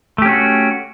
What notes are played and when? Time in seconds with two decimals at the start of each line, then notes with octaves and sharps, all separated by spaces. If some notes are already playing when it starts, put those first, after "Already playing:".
0.18 A3
0.22 G4
0.25 C#4
0.29 F#4